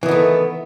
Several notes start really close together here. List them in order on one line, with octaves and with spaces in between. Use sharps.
E3 D#3 B3 A3